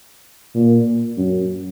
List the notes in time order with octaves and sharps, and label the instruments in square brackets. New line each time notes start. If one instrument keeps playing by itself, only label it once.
[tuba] A#2
F#2